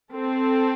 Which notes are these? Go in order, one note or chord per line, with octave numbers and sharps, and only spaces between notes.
C4 A4